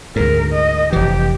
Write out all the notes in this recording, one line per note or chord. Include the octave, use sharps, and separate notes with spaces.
D2 G#2 A#4
D#5
F1 E3 G4